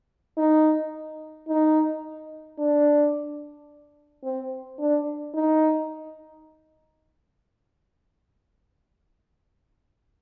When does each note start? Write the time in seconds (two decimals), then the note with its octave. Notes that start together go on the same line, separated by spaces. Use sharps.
0.37 D#4
1.48 D#4
2.58 D4
4.23 C4
4.79 D4
5.34 D#4